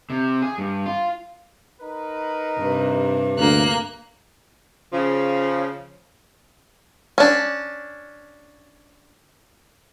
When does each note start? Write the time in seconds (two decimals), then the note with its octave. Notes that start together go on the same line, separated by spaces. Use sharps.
0.10 C3
0.42 G#4
0.58 G2
0.86 F4
1.81 D#4 A#4 B4
2.58 G2 C3
3.39 D2 A#3 F#6
4.93 C#3 F3
7.18 C#4 D4